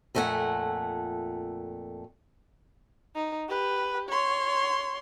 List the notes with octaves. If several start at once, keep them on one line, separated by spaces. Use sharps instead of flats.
F2 A#2 A3 B3 F#5 G#5
D#4
G4 B4
C#5 C6